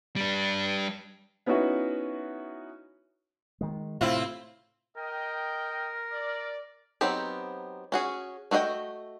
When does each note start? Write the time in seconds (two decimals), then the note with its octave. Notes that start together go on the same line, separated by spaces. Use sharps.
0.16 G3 D4
1.46 B3 C#4 D#4 E4 F#4
3.61 D#3 G#3
4.01 A2 C3 A3 C4 E4 F4
4.96 A#4 D#5 G5
6.11 D5
7.01 F#3 B3 C4 D#4 G4
7.92 C#4 F#4 G#4
8.51 A3 F#4 G#4 D#5 G5